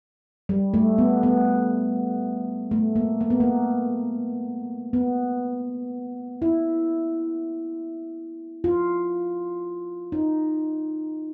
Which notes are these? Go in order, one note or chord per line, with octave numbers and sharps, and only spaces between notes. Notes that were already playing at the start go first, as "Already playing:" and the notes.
G3
A3
B3
B3
A3
A#3
A#3
B3
A#3
B3
E4
F4
D#4